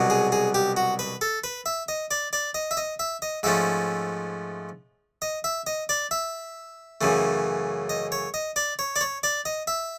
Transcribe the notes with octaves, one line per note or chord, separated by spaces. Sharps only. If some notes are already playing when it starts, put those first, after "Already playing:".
Already playing: C2 B2 F#3
G#4
G#4
G4
F#4
B4
A4
B4
E5
D#5
D5
D5
D#5
E5
D#5
E5
D#5
G#2 F3 A3 C#4 E5
D#5
E5
D#5
D5
E5
F#2 C#3 E3 A3
D#5
C#5
D#5
D5
C#5
D5
C#5
D5
D#5
E5